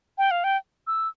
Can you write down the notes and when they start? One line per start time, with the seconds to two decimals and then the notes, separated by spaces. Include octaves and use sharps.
0.18 G5
0.31 F5
0.44 G5
0.87 E6